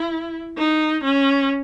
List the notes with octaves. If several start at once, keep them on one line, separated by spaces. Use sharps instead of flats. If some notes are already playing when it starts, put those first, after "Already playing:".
Already playing: E4
D#4
C#4